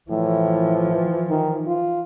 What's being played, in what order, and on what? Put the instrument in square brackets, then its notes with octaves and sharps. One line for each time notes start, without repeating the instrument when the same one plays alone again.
[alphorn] A2 [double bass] E3 F3
[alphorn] D#3
F4